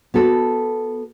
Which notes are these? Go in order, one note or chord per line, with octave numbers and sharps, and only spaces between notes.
B3 F#4 A4